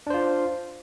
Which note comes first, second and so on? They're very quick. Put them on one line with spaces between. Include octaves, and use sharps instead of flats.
D4 C5 F4